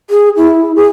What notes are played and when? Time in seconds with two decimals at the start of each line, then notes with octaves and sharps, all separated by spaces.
0.10 G#4
0.37 E4
0.76 G#4